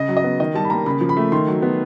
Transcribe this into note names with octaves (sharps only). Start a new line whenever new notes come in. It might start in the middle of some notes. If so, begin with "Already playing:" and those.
Already playing: C#3 D#5
F#3
D#5
B3
D#3 D#5
G3 A5
B5
A#3 A#5
C#3 B5
F3
B5
A3
D#3 C6
F#3
B3